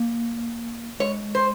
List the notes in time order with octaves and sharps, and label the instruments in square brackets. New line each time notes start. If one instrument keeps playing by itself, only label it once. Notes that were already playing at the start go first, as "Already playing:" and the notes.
Already playing: [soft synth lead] A#3
[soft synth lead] G#3 [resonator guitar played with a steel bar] C#5
[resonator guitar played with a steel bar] C5